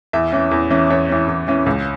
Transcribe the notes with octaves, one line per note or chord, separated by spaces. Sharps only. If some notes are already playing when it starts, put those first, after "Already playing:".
E2 E5
E3 C#4
E2
E3 C#4
E2 C#5
E3 C#4
E2
E3 C#4
C#2